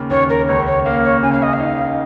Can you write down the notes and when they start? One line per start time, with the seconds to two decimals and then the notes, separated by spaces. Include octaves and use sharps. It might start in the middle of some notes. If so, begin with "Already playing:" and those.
Already playing: D#2 C#3 A#3
0.10 D#2 C#5
0.29 A#4
0.48 C#2 C#5
0.67 C#5
0.85 A#3 F5
1.04 C#5
1.22 C#3 G#5
1.32 F5
1.43 D#5
1.53 F5
1.60 D#4